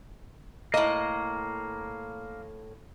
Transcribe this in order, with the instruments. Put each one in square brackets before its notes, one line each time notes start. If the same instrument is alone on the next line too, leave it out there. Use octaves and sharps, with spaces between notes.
[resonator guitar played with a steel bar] A2 D#5 [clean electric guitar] A#3